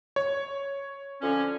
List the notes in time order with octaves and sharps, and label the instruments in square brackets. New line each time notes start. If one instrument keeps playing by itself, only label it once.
[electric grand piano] C#5
[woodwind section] D3 F3 C#4